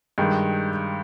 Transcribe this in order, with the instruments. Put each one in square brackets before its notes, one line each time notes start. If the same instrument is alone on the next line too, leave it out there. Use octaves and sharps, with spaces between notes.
[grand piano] G2 D#3 G#3